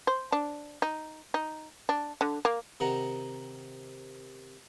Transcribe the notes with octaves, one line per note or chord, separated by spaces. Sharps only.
C5
D4
D#4
D#4
D4
D3
A#3
C3 D#3 F#5 A#5